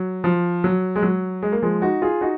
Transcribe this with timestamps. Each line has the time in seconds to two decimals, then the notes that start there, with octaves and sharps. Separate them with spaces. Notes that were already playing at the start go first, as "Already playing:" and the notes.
Already playing: F#3
0.24 F3
0.64 F#3
0.96 G#3
1.02 F#3
1.42 G#3
1.52 A#3
1.62 F3 G#3
1.82 D#4 F#4
2.02 F4 G#4
2.21 D#4 F#4